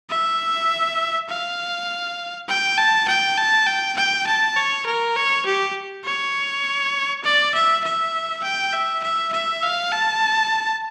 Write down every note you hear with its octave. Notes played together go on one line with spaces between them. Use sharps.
E5
F5
G5
A5
G5
A5
G5
G5
A5
C#5
A#4
C#5
G4
C#5
D5
E5
E5
G5
E5
E5
E5
F5
A5